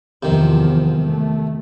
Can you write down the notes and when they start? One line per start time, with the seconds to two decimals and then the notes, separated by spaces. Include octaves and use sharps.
0.23 E2 C3 D#3 F3
1.01 A3